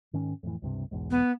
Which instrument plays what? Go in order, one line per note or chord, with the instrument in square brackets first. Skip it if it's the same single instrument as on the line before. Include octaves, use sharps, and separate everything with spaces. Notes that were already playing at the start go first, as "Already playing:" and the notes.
[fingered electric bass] G#2 D#3 C#4
F2 A2 E3
C#2 G2 C3
B1 E2 G#2
[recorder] B3